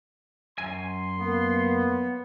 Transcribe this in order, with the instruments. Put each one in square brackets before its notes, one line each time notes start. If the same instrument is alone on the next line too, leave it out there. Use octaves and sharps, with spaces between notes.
[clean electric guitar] F#2 G#5 [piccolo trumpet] C6
[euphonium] A#3 [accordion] B3